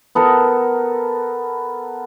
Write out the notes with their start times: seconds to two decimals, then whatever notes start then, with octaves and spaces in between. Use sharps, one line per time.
0.15 B3 A4 A#4 A#5